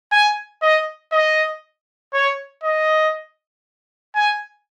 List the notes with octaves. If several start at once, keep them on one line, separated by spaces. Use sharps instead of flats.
G#5
D#5
D#5
C#5
D#5
G#5